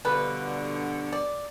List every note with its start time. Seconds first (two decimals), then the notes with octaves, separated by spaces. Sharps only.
0.05 G2 B2 D3 F3 B4
1.13 D5